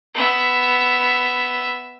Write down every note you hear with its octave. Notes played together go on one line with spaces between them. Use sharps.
B3 E5